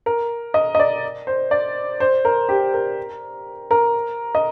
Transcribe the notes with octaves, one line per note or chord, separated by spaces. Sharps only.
A#4
D#5
D#5
D5
C5
D5
C5
A#4
G4
A#4
A#4
D#5